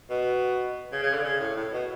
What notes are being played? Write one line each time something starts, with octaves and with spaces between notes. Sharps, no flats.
B2
C#3
C#3
D3
C#3
A2
A2
B2